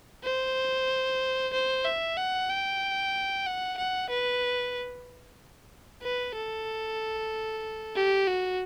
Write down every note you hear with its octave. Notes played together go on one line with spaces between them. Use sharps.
C5
C5
E5
F#5
G5
F#5
F#5
B4
B4
A4
G4
F#4